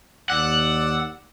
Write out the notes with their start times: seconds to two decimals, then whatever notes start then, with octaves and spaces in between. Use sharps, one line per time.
0.30 D#2 D5 F#5 E6